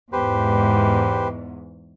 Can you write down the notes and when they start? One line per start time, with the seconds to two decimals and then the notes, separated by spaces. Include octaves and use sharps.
0.13 E2 G#2 G4 B4 C5